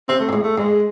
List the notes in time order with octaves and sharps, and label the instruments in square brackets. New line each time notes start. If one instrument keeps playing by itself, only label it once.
[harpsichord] C3 [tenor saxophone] C4
[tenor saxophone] A3
[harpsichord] G#2
[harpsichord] A2 [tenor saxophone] G#3
[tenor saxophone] A3
[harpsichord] G#2 [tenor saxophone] G#3